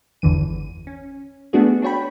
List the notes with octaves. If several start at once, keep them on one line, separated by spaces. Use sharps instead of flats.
G1 E2 D3 E3 D#7
C#4
A3 B3 D4 F#4 G#4
D4 F#4 C#5 G5 B5